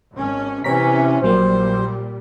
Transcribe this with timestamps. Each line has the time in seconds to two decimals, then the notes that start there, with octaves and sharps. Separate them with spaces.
0.14 G#1 C#4
0.64 C3 E3 C#4 C#5 A#5 B6
1.23 A#1 A#2 F#3 G3 A#3 C5